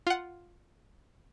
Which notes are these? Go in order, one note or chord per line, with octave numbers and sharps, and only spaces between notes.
F4 F#5